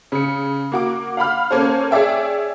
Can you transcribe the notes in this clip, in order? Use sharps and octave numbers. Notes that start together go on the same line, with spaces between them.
C#3 C#7
A#3 F#4 D6
F5 F#5 B5 F6
A#3 C#4 A4 C5
G#4 C#5 D5 E5 G5